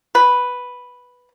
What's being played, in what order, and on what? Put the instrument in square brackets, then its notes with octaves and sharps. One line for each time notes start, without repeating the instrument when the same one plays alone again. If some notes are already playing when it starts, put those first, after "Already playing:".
[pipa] B4